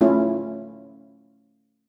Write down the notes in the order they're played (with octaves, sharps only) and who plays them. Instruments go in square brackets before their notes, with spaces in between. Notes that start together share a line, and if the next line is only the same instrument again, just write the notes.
[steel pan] A3 C#4 E4 F4